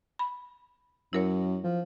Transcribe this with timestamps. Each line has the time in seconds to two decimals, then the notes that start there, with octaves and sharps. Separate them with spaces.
0.19 B5
1.13 F#2 E4 A#4 C#5
1.64 F3